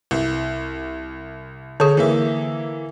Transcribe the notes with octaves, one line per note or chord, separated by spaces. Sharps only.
C2
D3 G#4 C#5
E3 A#3 E5